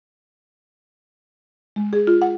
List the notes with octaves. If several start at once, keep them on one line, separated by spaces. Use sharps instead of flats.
G#3
G#4
F4
F#5